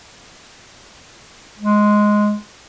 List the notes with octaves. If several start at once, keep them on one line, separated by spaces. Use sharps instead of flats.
G#3